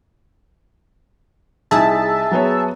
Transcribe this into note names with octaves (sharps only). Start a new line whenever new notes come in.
C2 D#4 E4 G#4 E5 A5
F#3 B3 C#5